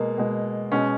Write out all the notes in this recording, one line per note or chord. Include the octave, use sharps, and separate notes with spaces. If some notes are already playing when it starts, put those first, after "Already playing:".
Already playing: B2 G#3 A#3
B2 G#3
B2 G#3 C#4